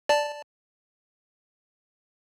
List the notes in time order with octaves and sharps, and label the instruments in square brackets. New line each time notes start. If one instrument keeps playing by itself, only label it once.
[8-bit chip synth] D5 A5